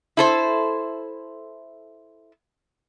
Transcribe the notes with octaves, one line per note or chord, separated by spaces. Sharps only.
E4 A4 C5